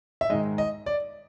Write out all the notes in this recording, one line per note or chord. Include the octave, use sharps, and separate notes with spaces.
E5
G#2 D#3 G#3 D#5
D#5
D5